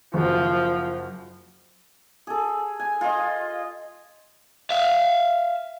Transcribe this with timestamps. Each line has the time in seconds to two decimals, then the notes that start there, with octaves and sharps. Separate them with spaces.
0.14 F#1 F3 F#4
2.27 G#4 A4
2.80 G#5
3.01 F4 D#5
4.70 E5 F5